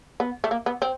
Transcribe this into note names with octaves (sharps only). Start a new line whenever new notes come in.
B3
A3
A#3
B3
C4